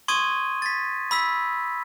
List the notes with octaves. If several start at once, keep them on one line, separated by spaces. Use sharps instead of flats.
C6 C#6 D#6 G#6 D#7
A6 B6
B5 E6 B6